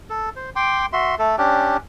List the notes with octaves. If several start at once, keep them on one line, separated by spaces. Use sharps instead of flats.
A4
C5
G5 C6 D6
F#4 E5 C6
A3 A4
C#4 D4 G4